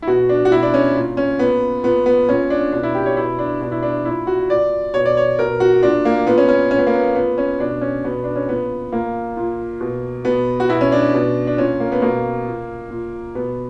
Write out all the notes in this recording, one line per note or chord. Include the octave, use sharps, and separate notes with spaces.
E4
B2 F#4
D4
F#4
B2 E4
D4
C#4
A#2
C#4
A#2 B3
A#2 B3
B3
A#2 C#4
D4
B2 D4
E4
G4
C#5
B2 E4
D4
B2 D4
E4
D4
A#2 E4
F#4
A#2 D5
B2 C#5
D5
C#5
B2 A#4
F#4
A#2 D4
A#3
A#2 B3
C#4
C#4
A#2 C#4
B3
A#3
B3
A#2 B3
C#4
B2 D4
C#4
B2 B3
D4
C#4
A#2 B3
A#2 A#3
A#2
B2
B2 B3
F#4
B2 E4
C#4
D4
B2
D4
A#2 C#4
A#3
B3
B2 A#3
A#2
A#2
B2 B3